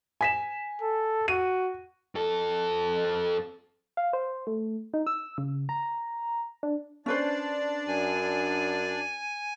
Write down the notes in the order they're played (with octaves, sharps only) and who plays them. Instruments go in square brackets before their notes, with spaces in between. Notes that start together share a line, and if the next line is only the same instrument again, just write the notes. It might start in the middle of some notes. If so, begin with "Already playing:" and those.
[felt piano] G#5 B6 E7
[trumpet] A4
[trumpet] F#4 [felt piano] D#7
[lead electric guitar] F2 A4
[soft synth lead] F5
C5
A3
D#4
E6
C#3
A#5
D4
[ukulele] C#4 B4 C5 [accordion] D4 D5
[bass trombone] F#2 [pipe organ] G#5